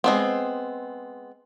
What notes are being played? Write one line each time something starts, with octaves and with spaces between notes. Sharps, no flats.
G#3 B3 C4